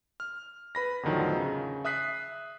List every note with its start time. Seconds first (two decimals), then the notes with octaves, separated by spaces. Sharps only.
0.20 F6
0.75 B4 B5 A#6
1.03 E2 A2 D3 D#3 F3 F#3
1.36 C#3
1.85 E5 D#6 F#6 B6 C7